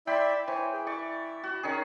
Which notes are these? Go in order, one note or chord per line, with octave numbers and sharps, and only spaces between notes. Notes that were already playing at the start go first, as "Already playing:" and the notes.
E4 D5 E5 G5 B5 C6
E3 C5 C#5
G#4 G5
E4 D5 C#6
F#4
D#3 C#4 G#4